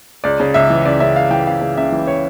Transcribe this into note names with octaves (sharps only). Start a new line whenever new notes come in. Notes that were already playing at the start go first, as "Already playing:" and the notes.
C#2 D5
C#3
C#2 E5
E3
C#2 D5
C#3 E5
C#2 F5
E3 G5
C#2 F5
C#3
C#2 E5
E3
C#5